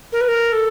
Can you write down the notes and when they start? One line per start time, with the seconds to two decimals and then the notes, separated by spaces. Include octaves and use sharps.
0.12 A#4
0.21 B4
0.28 A#4
0.52 A4